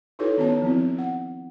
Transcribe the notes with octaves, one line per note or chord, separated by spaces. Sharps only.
D#4 E4 F#4 A4 B4 C#5
D#3 B3 C#4 F#4 C#5 A5
F3 C4 E4
F#5